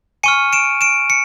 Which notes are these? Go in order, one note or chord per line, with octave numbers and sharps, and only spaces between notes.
G#5 C#6 F6 C#7 D#7
D7 E7
D7 E7
C#7